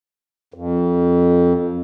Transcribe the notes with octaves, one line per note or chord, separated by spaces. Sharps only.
F2